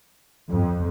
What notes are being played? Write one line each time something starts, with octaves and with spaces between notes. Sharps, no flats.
F2